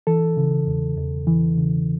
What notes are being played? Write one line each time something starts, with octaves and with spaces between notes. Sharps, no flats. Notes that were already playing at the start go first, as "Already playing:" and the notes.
E3 A4
C#3
E2
E2
E3
C#3